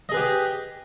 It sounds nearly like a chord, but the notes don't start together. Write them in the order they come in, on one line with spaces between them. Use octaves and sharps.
D#5 G#4 B4 G4